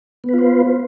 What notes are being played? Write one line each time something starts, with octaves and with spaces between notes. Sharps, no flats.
B3 F4 B4 C5